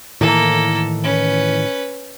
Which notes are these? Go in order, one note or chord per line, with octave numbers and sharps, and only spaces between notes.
A2 D#3 E3 A#3 A4
C#4 B4